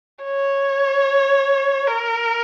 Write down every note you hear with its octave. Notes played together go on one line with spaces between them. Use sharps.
C#5
A#4